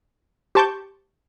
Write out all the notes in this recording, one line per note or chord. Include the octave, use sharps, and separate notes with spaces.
G4 C5 A5 C#6 D6 G6